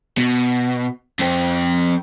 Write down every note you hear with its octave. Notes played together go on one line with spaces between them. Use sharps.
B2
F2 C4